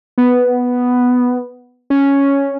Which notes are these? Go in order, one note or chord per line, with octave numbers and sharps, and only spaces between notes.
B3
C#4